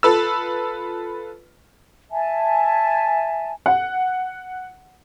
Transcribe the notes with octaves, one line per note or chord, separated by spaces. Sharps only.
F4 A4 B4 E6
E5 G#5 A5
F#5